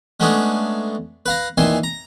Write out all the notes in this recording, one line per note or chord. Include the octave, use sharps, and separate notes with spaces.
G#3 A3 B3 C#4 D4 G#4
B4 F5 A#5
A#2 D#3 E3 G#5 C6
A#5